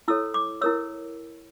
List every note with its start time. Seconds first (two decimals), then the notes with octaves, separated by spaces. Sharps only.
0.08 E4 A4 C#5 E6
0.34 D6
0.61 E4 A#4 C#5 E6